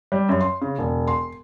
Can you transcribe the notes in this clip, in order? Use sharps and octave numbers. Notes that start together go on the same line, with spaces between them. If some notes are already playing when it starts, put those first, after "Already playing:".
G3
F#2
C6
C#3
E1
C6